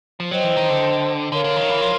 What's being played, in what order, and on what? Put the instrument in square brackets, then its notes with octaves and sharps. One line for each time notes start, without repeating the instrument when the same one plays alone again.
[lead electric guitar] F3
[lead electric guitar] F#3 [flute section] C5 D#5 G5
[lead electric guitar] E3
D#3
D3
[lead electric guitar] D3 [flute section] A#4 C#5 F5
[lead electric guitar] D3
D#3
E3
F3